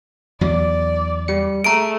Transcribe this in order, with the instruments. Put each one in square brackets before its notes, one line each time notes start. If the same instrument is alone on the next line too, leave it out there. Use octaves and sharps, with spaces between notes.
[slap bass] E2 F#3 [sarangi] D5
[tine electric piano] G3 C#7
[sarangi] A3 [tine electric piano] G#4 [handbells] A#5 D7